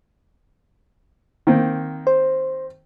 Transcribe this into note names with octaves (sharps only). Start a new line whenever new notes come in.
D#3 A#3 C4
C5